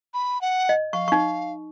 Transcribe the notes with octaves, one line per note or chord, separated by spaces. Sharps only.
B5
F#5
D#5
F5 C#6
D#4 C#6